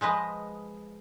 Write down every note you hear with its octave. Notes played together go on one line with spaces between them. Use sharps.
F3 G#3 B4 D#5